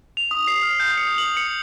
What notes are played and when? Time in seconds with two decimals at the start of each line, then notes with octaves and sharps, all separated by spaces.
0.17 F7
0.31 D#6
0.47 C7
0.63 F6
0.80 G6
0.98 C#7
1.18 F#7
1.37 C#7